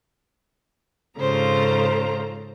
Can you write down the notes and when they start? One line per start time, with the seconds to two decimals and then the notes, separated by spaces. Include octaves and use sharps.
1.18 G#2 C#3 F4 A4 C5 A#5